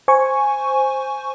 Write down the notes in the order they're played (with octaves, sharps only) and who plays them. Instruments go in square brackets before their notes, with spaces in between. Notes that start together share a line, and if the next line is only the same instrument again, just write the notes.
[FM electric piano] C5 G#5 C#6